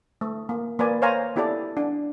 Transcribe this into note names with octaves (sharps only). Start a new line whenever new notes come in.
A3
A#3
A#3 B4 D5 G#5
C5 C#5 F5 G#5 A#5
B3 E4 G4 A4 D5
D4